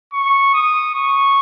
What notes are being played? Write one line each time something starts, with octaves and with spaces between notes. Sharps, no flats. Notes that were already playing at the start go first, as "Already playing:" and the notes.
C#6
D#6
C#6